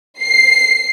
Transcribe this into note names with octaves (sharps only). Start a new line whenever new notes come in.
C7